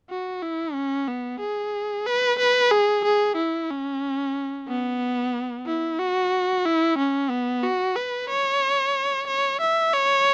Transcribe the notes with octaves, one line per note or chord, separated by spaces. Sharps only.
F#4
E4
C#4
B3
G#4
B4
B4
G#4
G#4
E4
C#4
B3
E4
F#4
E4
C#4
B3
F#4
B4
C#5
C#5
E5
C#5